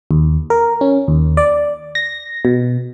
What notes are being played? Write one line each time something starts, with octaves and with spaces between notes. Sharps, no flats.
D#2
A#4
C#4
D#2
D5
A#6
B2